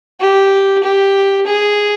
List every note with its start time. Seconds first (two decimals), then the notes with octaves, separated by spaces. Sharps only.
0.20 G4
0.83 G4
1.46 G#4